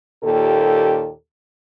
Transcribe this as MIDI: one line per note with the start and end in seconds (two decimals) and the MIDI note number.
0.23 1.09 39
0.23 1.09 46
0.23 1.09 67
0.23 1.09 69